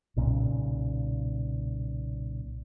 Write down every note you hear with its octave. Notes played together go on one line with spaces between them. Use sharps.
B1 A#2 C#3